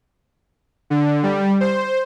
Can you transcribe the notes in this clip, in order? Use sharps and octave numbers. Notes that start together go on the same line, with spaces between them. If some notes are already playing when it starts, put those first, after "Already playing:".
D3
G3
C5